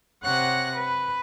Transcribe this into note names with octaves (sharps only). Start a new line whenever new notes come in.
C3 C#5 F#5 F#6 A#6
B4